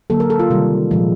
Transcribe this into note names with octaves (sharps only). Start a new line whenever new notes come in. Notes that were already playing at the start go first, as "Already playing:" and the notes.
D3 F#3 A#3 A4
A#4
A4
F4
C3 D#3 G3
A#2 F3 G#3